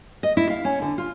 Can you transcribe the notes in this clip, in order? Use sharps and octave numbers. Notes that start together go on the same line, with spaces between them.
D#5
E4
F5
C#4
D3
F4